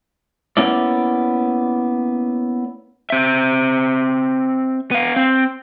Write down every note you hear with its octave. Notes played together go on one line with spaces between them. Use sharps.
A#3 B3 C#4 E4 D5
C4 E5
B3 F5
C4